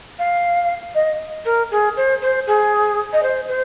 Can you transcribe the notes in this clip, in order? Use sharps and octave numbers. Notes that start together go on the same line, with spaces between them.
F5
D#5
A#4
G#4
C5
C5
G#4
D#5
C5
C5